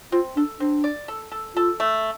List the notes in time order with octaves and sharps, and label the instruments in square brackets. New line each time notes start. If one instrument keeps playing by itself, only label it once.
[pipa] C4 [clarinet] F4
[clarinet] D4 [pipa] A4
[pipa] C4 [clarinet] D4
[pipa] D5
A4
A4
[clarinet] F4 [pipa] A4
[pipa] A3